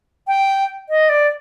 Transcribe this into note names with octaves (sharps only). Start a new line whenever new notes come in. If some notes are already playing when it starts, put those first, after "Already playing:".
G5
D#5
D5